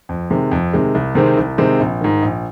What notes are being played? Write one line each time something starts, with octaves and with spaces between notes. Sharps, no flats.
F2
C3 D#3 G#3
F2
C3 D#3 G#3
C2
C3 D#3 G#3 C4
C2
C3 D#3 G#3 C4
A#1
G#2 D#3
A#1